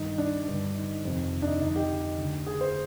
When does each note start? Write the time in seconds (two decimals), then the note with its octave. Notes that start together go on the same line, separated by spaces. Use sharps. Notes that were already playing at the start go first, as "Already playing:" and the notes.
Already playing: G2 D#3 D#4
0.18 D4
0.48 G2 D3
0.75 D#4
1.05 F2 C3 D#3
1.42 D4
1.47 D#4
1.62 F2 D3 D#4
1.76 G4
2.18 D2 D3
2.46 G#4
2.61 C5